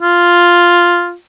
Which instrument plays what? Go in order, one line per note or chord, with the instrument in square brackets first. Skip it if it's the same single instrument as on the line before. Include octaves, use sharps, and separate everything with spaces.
[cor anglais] F4